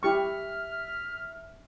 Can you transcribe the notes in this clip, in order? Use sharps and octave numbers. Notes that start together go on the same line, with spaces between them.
E4 G4 E5 C#6 F6